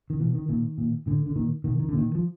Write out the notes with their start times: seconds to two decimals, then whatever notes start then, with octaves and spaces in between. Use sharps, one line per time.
0.10 D#3
0.19 B2 E3
0.35 D#3
0.49 A#2 D#3
0.78 A#2
1.06 A2 D3
1.26 D3
1.36 A#2 D#3
1.64 B2 D#3
1.80 D#3
1.88 D3
1.93 A#2 D#3
2.15 F3